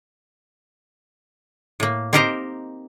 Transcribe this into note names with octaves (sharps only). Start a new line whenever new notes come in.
A2 A#3
C4 D#4 G4 A#4 C5 A#5